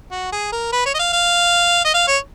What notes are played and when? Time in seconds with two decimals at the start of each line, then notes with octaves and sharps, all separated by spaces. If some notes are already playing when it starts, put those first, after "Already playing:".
0.11 F#4
0.32 G#4
0.52 A#4
0.73 B4
0.86 C#5
0.94 D#5
0.99 F5
1.13 F5
1.85 D#5
1.94 F5
2.08 C#5